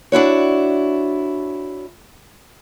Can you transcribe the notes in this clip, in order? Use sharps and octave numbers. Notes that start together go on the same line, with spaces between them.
D4 E4 F#4 C#5